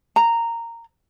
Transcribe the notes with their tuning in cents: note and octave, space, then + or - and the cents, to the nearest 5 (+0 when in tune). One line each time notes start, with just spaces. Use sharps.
A#5 -10